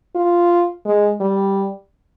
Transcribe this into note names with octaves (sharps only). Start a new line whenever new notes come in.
F4
G#3
G3